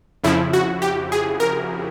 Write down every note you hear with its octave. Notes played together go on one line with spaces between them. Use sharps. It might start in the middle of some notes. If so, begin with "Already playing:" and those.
F2 C#3 F3 E4
F#4
G4
G#4
A#4